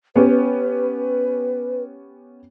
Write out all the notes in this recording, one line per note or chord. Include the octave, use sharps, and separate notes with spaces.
B3 C#4 G4 B4